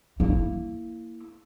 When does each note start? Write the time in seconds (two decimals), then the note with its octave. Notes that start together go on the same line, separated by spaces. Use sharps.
0.20 A#3 E4